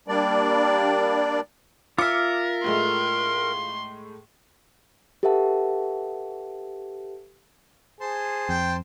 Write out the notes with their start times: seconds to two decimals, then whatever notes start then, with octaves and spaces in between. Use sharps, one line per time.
0.08 G3 A#3 D4 D5
1.98 F4 A#4 E5 D6 C#7
2.64 A2 G#3 A3 C6
5.23 G4 A4 B4 E5 F#5 A5
8.01 G#4 C5 A5 C6
8.49 F2 G5